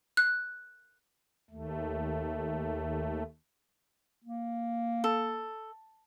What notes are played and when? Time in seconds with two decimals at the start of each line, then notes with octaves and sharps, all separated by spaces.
0.17 F#6
1.50 D#2 A3
4.24 A#3
5.04 A4